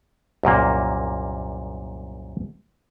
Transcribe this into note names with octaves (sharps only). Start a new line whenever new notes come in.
C2 F#2 A#2 A#3